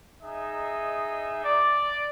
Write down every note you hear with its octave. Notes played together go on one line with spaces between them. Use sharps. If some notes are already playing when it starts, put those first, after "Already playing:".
D#4 G#4 D#5 E5
D5